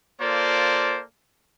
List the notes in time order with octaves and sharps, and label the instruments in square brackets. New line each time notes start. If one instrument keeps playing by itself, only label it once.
[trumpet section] A#3 F4 A4 C5 D5